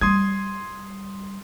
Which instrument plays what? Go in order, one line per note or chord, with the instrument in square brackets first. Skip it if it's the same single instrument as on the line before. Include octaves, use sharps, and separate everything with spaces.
[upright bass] G3 [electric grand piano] C6 D#6 G#6